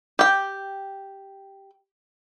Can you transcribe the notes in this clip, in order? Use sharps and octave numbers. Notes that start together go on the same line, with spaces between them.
G4 G5